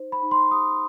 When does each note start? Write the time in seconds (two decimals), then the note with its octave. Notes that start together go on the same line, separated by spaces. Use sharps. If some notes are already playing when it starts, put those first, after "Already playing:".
Already playing: D#4 C5
0.12 B5
0.23 D#4
0.31 C6
0.51 G4 D#6